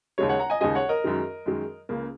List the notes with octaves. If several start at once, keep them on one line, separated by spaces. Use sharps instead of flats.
D#2 C#3 G#3 C#5
C#5 F#5
F#5 A#5
D#5 G#5
D#2 C#3 G#3 D#5 G#5
C#5 F#5
A#4 D#5
F#2 D#3 G#3
F#2 D#3 G#3
C#2 C#3 A#3